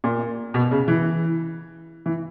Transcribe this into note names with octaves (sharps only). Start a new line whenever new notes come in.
A#2
B2
C#3
E3
E3